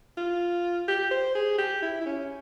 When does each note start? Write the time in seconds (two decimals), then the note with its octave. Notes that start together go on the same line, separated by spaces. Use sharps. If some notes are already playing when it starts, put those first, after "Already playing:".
0.17 F4
0.88 G4
1.11 C5
1.35 G#4
1.58 G4
1.82 E4
2.01 E4
2.06 C#4